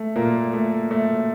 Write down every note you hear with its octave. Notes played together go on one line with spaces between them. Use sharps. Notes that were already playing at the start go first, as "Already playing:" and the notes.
Already playing: A3
A#2 A#3
A3
A3